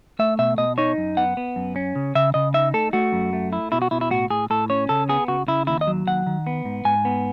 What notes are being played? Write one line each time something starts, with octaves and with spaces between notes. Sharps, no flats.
A3 E5
B2 E5
B2 D#5
D#4 C#5
F#2
B3 F#5
B3
F#2
C#4
C#3
C#3 E5
C#3 D#5
D#4 E5
A3 A4
A3 F#4
F#2
A3
E4
B2 E4
F#4
B2 E4
E4
A2 F#4
A2 G#4
A2 A4
C#4 C#5
C#3 A4
B3 G#4
C#3 F#4
C#3 E4
D#2 E4
D#5
F#3
D#2 F#5
D#3
B3
G#2
G#2 G#5
B3